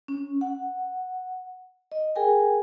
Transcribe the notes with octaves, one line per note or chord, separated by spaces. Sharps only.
C#4
F#5
D#5
G#4 A#4 G5 G#5